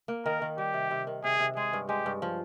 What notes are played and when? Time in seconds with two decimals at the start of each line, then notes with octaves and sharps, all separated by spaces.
0.08 A#3
0.25 D#3 A#4
0.42 D#3
0.57 G3 G4
0.74 C3
0.91 C3
1.07 D#3
1.24 C3 G#4
1.40 C3
1.56 G#3 G#4
1.73 G2
1.89 G#3 G4
2.06 G2
2.22 F3